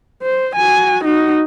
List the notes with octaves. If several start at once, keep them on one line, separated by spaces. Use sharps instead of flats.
C5
F#4 G#5
D#4 F#4